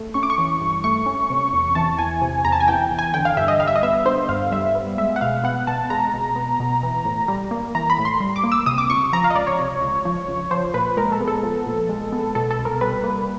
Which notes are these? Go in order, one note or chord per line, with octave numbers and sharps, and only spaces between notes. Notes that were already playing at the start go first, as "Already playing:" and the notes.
Already playing: A3
C#4 C#6
D6
C#6
E3
G2
A3 C#6
C#4
C3
E2
E3 A5
E2 G#5
C3
E2 A#5
A5
G#5
E3 G5
E2
G#5
D3 G5
F5
G2 E5
D#5
G3 F5
E5
D#5
B3 E5
D3 C5
G2 F5
G3 E5
B3
G#3 E5
F#5
B2 F5
B3 F#5
B2 A5
G#3 A#5
B2
B3
B2
E3
A2
G3
A#3
E3 A#5
B5
A2
C6
G3
D6
A#3
E6
C3 D#6
D6
C#2 C#6
F3 A#5
F5
D#5
C#2 D5
C#5
C3
C#2
F3
C#2
F3 C5
A#2 B4
G#3 A#4
A4
B3
A4
F3
A#2
G#3
B3
B2 A4
A4
C2
A#4
G3 B4
A#3